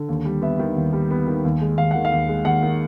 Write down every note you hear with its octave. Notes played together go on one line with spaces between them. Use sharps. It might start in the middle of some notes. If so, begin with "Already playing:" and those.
Already playing: D3
D#2
G3
B3 E5
D#3
D#2
G3
B3
D#3
D#2
G#3
D#2 F5
D#3 F#5
F5
D#2
G#3
D#2 F#5
D#3